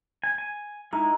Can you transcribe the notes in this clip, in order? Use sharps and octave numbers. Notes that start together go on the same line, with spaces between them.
G#5
G#5
G#3 D#4 E4 A#5